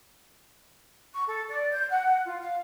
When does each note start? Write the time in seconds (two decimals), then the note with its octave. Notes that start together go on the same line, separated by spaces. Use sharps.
1.14 C#6
1.27 A4
1.49 D5
1.72 G6
1.90 F#5
2.25 F4
2.41 F5